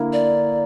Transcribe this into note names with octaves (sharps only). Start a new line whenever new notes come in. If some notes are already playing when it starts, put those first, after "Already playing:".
Already playing: D3 A#3 E4 A#4
D5